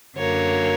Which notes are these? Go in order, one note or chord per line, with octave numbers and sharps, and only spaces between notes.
F#2 D3 F#3 A#3 C#5